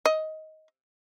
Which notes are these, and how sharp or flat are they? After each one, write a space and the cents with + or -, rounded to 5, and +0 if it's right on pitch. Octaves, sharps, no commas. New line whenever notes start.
D#5 +15